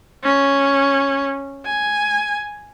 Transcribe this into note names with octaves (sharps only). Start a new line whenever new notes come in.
C#4
G#5